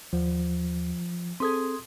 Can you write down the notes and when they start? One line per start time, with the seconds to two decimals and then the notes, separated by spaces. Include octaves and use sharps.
0.13 D#2 F3
1.40 C4 G#4 A4 C6 D#6 G#6